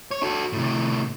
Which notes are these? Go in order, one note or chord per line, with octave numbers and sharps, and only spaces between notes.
C#5
F#4 A4
A2 C3